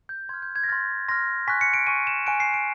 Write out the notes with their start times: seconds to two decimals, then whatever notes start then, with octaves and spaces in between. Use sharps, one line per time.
0.09 G6
0.29 C6 G#6
0.34 F6
0.42 G6
0.55 G#6
0.64 A#6
0.68 C6 F6 A6
1.09 C6 F6 A#6
1.48 G#5 C#6 F#6 B6
1.61 C#7
1.74 D7
1.87 G#5 C#6 F#6 D#7
2.07 E7
2.26 G#5 C#6 F#6 D7
2.40 C7
2.54 D7